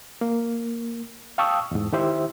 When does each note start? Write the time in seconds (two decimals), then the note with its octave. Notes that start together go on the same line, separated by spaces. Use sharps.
0.21 A#3
1.38 F5 G5 A5 C#6 D#6 E6
1.71 E2 G#2
1.92 D#3 E4 G4 C5 E5